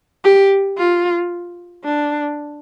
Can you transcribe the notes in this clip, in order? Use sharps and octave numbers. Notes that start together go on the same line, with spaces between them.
G4
F4
D4